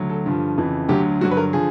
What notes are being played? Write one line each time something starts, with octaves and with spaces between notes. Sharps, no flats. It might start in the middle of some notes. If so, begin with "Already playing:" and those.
Already playing: D2 F#3
A4
G2 D3 F3
F2 C#3 E3
D2 D3 F#3 G4
G2 D3 F#3 F#4
B4
A#4
D3 F3 G#4